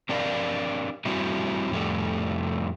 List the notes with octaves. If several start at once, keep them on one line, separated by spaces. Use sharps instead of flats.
C4 D4 G4 A#4 D5 F5
G3 C4 E4 F#4 G4
F2 A2 G3 A3